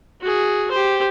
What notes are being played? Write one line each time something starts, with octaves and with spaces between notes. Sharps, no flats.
F#4 G#4
G4 C5